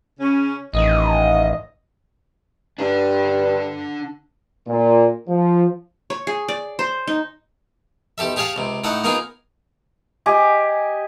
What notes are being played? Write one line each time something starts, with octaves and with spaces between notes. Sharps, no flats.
C#3 C#4
A1 D#3 D#5
G2 D3 D4
A#2
F3
C#5
G#4
D5
C5
D#4
B1 G4 A4 E5
G4 G#4 C#5 F5 A5
C#2 C3
A2 D#4 A4 F#5
A#3 B3 D#4 F4 G#4
G4 D#5 G#5 D6